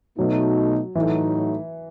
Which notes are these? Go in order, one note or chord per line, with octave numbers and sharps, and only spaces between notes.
B2 F#3 A3 D#4
A2 E3 F#3 A3 D#4